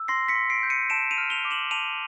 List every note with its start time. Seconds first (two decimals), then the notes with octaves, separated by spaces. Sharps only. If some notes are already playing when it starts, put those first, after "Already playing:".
Already playing: E6
0.08 C6 A#6 C7
0.28 B6 C#7
0.35 C6
0.50 C7 D7
0.63 G6
0.70 C#7 D#7
0.90 A5 D7 E7
1.11 D#7 F7
1.18 F6
1.30 F7 G7
1.45 D6
1.51 E7 F#7
1.71 A5 D#7 F7